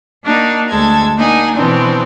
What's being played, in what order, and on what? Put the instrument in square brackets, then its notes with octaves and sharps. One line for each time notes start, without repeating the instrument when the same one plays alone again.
[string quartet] A#3 D4 D#4 F#4
D2 G#3 A4 G#6
A#3 D4 D#4 F#5 G#5
B2 E3 F3 B3 C4 D4